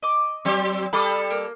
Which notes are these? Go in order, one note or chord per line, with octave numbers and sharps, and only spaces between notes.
D#5 D6
F#3 C4
G3 A4 B5 D6 D#6
A#3